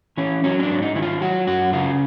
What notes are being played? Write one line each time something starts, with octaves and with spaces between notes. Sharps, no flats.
E3 C#4
F#3 C#4
C#4
D4
G#2
D#4
D#3 E4
F4
F#3 F#4
F#2 F#4
C#3 F4